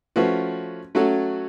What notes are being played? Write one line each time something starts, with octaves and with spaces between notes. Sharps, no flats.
F3 A3 C#4 F#4 B4
F#3 A3 C#4 F#4 A4